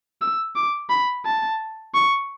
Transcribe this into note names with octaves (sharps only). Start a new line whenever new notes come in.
E6
D6
B5
A5
C#6